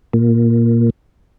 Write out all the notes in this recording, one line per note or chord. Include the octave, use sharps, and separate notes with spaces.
A#2